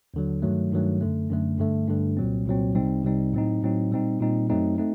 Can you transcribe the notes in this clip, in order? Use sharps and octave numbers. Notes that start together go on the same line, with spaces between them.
D#2 D3 F#3
G2 D#3 F#3 A3
G2 D#3 F#3 A3
F#2 D3 A3
F#2 D3 A3
G2 D3 A3
G2 D3 A3
C2 A#2 F#3 C4
C2 A#2 F#3 C4
C2 C3 G3 C4 D#4
C2 C3 G3 C4 D#4
A2 F#3 C4 D#4
A2 F#3 C4 D#4
A#2 G3 C4 D#4
A#2 G3 C4 D#4
F#2 F#3 A3 C4 D#4
A3 C4 D#4